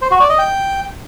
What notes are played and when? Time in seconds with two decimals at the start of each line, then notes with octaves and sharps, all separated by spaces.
0.02 C5
0.11 F#4
0.20 D5
0.29 D#5
0.39 G5